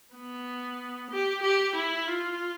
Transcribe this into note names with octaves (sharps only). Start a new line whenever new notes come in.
B3
G4
G4
E4
F4